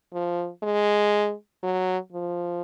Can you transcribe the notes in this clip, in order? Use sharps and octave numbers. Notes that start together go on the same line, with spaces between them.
F3
G#3
F#3
F3